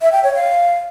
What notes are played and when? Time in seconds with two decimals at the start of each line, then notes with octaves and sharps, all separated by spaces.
0.01 E5
0.12 G5
0.24 C#5
0.35 F5